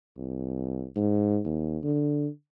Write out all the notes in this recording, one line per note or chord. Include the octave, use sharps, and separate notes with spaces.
C2
G#2
D#2
D3